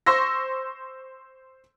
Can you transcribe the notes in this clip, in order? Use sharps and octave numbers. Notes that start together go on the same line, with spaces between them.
C5 C6 C#6 E6 A#6